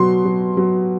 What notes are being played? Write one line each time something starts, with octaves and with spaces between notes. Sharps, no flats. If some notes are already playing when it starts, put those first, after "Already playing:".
Already playing: B2 F#3 C6
F#3
F#3